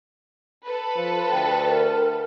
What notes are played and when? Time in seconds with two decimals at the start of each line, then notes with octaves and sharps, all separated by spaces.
0.64 A4 B4
0.96 F3
1.31 D2 G5
1.68 A#4